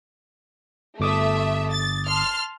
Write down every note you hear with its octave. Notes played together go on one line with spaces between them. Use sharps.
G1 A3 E5 D6 D#6
A6
A5 C6 F6